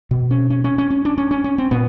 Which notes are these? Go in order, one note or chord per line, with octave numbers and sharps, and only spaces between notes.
B2
C#4
C#4
C#4
C#4
C#4
D4
C#4
C#4
C#4
C4
A#2 B3